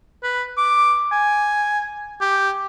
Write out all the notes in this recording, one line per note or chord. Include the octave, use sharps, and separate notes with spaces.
B4
D6
G#5
G4